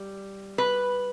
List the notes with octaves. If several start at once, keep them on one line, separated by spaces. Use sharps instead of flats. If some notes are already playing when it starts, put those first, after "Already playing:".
Already playing: G3
B4